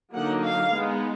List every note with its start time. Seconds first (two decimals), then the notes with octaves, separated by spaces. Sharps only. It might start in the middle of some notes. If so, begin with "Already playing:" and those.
0.14 D3 F#3 A#3 D#4 F#5
0.43 F5
0.71 G#3 B3 D#4